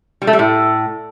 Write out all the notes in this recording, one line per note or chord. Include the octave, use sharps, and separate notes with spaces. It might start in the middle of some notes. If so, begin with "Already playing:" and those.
G3
A3
G3
A2